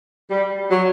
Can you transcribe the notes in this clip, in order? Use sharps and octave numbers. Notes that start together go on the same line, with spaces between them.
G3
F#3